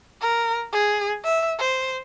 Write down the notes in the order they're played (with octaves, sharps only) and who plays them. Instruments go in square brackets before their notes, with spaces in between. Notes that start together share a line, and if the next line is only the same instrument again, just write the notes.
[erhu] A#4
G#4
E5
C5